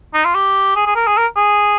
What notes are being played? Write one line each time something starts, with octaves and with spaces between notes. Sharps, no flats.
D#4
F4
G4
G#4
G#4
A#4
G#4
A#4
G#4